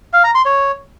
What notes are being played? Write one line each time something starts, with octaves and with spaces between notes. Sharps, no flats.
F5
A#5
C6
C#5